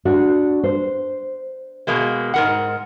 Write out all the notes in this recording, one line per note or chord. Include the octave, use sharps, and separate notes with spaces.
D4 F#4
C5
B2 G#3 A#3
G#2 A#4 F#5